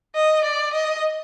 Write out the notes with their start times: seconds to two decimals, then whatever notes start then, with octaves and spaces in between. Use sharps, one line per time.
0.15 D#5
0.44 D5
0.73 D#5